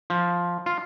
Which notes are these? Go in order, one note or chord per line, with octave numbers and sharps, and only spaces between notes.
F3
F4